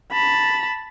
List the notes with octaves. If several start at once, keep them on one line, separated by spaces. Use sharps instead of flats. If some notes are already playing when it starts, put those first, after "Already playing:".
A5 B5